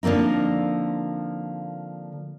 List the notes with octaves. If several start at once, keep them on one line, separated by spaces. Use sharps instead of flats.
D3 F3 A#3 C4 D#4